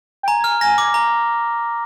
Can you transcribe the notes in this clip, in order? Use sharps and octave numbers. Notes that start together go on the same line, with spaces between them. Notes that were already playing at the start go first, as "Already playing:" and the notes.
G5
G#5 A#5
F6
A#6
D6
A#5